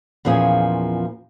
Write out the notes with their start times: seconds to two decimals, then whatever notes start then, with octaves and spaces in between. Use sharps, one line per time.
0.25 E2 A#2 F3 C#4 G#4